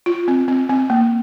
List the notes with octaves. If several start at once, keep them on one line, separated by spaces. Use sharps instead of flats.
F4
C4
C4
C4
A#3